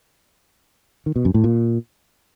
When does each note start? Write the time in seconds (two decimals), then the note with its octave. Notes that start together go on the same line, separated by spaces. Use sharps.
1.06 D#3
1.16 B2
1.25 F#2
1.34 A2
1.44 A#2